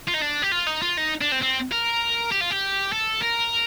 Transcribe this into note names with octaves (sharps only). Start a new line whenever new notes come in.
F4
D#4
D4
G4
F4
D#4
F4
D#4
D4
C4
C4
A#4
G4
F4
G4
A4
A#4